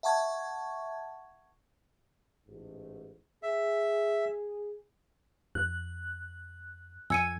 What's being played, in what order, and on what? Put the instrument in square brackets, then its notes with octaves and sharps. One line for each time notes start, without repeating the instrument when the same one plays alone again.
[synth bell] E5 F#5 A5 C#6 G#6
[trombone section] A1 G#2
[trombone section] G#4 [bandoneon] E5
[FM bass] F2 [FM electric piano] F#6
[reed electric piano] F2 G#6 [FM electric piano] G#5 [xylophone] E6 C#7 D#7